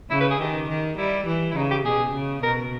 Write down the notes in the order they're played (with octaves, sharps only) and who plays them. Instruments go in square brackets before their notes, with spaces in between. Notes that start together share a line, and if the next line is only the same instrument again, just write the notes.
[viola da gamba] C#3 [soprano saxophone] E4
[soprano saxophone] B4
G#4
[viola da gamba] D#3 [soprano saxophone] G4
[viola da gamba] D#3
[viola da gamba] G3 [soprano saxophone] E4
[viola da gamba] E3
[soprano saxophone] E4
[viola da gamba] C#3 [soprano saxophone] D#4
[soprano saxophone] G4
[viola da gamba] B2 [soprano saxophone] G#4
[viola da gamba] C#3
[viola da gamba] B2 [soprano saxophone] A#4